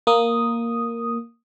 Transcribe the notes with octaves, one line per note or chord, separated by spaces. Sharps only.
A#3 D#6